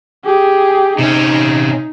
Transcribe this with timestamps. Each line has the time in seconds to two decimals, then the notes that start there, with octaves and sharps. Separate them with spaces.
0.24 G4 G#4
0.98 C3 C#4 D#4